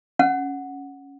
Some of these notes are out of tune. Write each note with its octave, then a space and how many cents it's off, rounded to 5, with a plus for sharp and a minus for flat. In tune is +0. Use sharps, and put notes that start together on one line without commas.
C#4 +0 F#5 -5